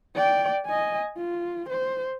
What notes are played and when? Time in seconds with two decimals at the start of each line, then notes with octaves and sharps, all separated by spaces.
0.15 D5 G5
0.66 D#5 G#5
1.17 F4
1.69 C5